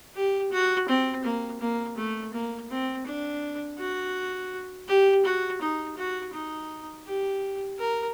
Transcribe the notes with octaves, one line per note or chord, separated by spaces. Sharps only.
G4
F#4
C4
A#3
A#3
A3
A#3
C4
D4
F#4
G4
F#4
D#4
F#4
D#4
G4
A#4